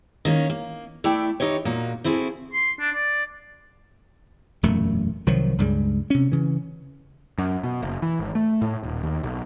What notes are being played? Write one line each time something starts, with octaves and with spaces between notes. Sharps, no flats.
D#3 A#3 C#4
A#3
A3 E4 D5 G5
D#3 D#4 E4 G4 C#5
A#2 A#3 D#4 F#4
C4 E4 F#4 G#4 A4
C6
D4
D5
E1 F#2 A#2 A3
C2 D#3 F3 F#3
C#2 G2 G3 G#3
C3 C#4
C#3 E3
F#2
B2
F#1
E3
G#1
A3
A2
D#1
D#2
B1